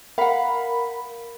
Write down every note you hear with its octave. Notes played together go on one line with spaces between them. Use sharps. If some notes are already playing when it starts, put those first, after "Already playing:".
A#4 F5 F#5 B5